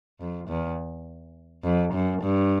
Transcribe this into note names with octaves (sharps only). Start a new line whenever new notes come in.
F2
E2
F2
F#2
G2